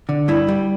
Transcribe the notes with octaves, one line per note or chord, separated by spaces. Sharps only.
D3
G2 E4
G3